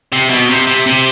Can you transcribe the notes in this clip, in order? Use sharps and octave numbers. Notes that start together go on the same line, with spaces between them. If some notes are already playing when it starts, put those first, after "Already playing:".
C3
B2
C3
C3
C3